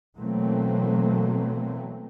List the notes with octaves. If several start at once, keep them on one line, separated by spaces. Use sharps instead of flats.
B2 E3 F#3 A3 A#3 C4